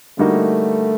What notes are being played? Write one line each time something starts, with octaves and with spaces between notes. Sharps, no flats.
D3 G3 A3 A#3 D#4 F#4